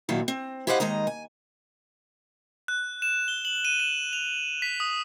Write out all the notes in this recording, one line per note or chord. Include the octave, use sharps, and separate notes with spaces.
D#2 A#2 D#3 F#3 E4 F5
C4
E4 G4 C5 D#5 F5 F#5
D#2 D#3 G#3 D#5 A#5
G#5
F#6
E7
G7
F#7
D#7
E7
F7
B6
D#6